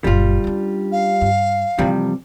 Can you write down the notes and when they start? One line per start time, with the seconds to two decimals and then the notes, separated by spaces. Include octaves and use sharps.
0.04 F#1 A#2 G3 F4
0.44 C#4 D4
0.92 F5
1.21 G2
1.78 F2 C3 E3 G3 A#3